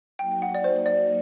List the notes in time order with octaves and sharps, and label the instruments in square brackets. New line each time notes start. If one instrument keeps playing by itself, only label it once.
[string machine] F#3 A#3 D#4 F#4 [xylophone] G5
[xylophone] F#5
D5
C5
D5